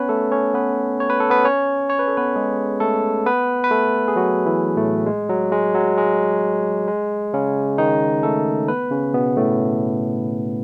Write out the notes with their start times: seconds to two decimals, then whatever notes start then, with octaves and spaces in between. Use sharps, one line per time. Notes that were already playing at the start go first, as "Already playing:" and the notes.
Already playing: B3 C#4 B4 C#5
0.09 A3 A4
0.32 C#4 C#5
0.54 B3 B4
1.00 C#5
1.10 B4
1.20 A4
1.30 B3 B4
1.44 C#4 C#5
1.90 C#5
1.99 B4
2.08 A4
2.17 B3 B4
2.36 G#3 G#4
2.80 A3 A4
3.26 B3 B4
3.64 B4
3.71 A3 A4
4.08 G#4
4.16 F#3 F#4
4.46 E3 E4
4.77 A2 A3
5.06 G#3
5.29 F#3
5.52 G#3
5.75 F#3
5.98 G#3
6.88 G#3
7.34 C#3 C#4
7.78 D#3 D#4
8.23 A3 A4
8.68 B3 B4
8.91 C#3 C#4
9.14 B2 B3
9.37 A2 A3